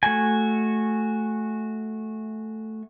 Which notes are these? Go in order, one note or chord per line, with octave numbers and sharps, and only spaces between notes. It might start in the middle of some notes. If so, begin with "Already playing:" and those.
A3 F#4 G#5